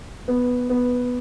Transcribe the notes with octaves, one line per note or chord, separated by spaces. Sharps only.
B3
B3